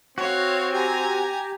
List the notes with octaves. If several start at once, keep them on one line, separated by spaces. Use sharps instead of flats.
C4 F#4 C#5 F5
G4 G#5 A#5